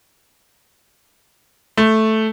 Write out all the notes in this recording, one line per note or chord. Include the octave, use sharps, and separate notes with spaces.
A3